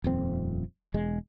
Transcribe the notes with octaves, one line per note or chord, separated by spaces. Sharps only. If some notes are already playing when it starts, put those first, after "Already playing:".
D#1 F2 C4
E1 G#3